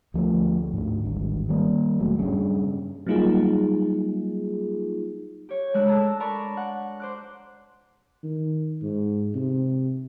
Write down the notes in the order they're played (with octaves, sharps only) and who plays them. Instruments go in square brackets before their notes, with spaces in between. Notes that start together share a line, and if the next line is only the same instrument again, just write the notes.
[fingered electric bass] D2 F3 G3 A3
D2 G#2
D1 G#1 G2
D#3 G3 G#3 A#3
E1 F#3 A3
G2 C#3
[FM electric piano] F#3 G3 A#3 D#4 F4 G#4
[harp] G4 C#5
G#3 D4 F#6
A4 A5 A#5 E6
A#4 D5 A5 B5 C#6 D6
F#5
C5 D6 F#6
[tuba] D#3
G#2
C3